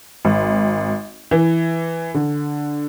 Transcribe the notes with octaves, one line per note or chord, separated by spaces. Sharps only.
G#1
E3
D3